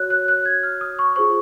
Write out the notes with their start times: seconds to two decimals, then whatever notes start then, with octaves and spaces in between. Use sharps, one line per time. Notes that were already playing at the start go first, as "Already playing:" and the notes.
Already playing: F#4 C#5 F#6
0.10 F#6
0.28 F#6
0.45 G#6
0.63 F6
0.81 D#6
0.99 C#6
1.16 F4 G#4 C5 C#6